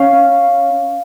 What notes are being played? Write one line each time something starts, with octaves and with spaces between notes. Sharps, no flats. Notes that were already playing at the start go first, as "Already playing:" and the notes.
Already playing: C#4 F5